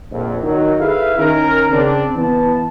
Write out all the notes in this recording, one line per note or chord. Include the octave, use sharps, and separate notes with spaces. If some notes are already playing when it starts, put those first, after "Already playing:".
A#1 F2
D#3 F#3
E4 G#4 A4 B4 E5 F5
D#3 C#4 A#4
C#3 C4 D4
E3 B3 A5